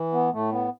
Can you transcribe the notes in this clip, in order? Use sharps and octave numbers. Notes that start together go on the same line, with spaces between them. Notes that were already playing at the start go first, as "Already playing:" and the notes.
Already playing: E3
B3
A2 A3
B3